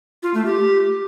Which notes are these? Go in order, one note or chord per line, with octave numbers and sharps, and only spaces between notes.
F4
A3
G4